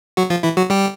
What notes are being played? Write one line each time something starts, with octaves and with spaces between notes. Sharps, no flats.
F#3 F#4
F3 F4
E3 E4
F#3 F#4
G3 G4